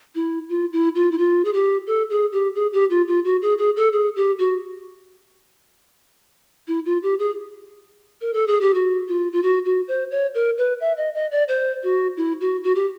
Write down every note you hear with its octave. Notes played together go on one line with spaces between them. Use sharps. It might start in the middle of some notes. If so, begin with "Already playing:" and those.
E4
F4
E4
F4
E4
F4
G#4
G4
A4
G#4
G4
G#4
G4
F4
F4
F#4
G#4
G#4
A4
G#4
G4
F#4
E4
F4
G4
G#4
A#4
A4
G#4
G4
F#4
F4
F4
F#4
F#4
C5
C#5
A#4
B4
E5
D#5
D#5
D5
C5
F#4
E4
F#4
F#4
G4